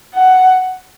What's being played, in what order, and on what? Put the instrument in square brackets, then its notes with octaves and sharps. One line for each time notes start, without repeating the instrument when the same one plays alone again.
[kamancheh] F#5